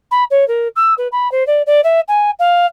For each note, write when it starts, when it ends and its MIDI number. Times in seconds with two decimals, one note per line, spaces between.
0.11 0.24 83
0.30 0.47 73
0.48 0.68 70
0.76 0.94 88
0.98 1.08 71
1.12 1.30 83
1.31 1.46 72
1.47 1.62 74
1.66 1.81 74
1.84 2.00 76
2.08 2.30 80
2.39 2.66 77